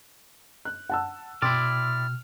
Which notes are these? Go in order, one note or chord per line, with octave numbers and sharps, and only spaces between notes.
F#6
F#5 A5 E6
B2 E4 D5 G5 C6 E6 F6